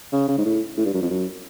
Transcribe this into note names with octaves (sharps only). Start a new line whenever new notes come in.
C#3
C#3
G#2
A2
A2
G2
F#2
F2
F#2